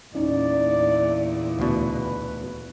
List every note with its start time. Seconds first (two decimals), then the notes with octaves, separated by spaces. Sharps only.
0.15 E2 A#2 C#4 D#4 D5
1.59 D2 B2 B4